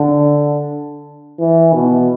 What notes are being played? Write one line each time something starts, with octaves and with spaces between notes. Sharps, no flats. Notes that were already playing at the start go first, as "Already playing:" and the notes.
Already playing: D3
E3
B2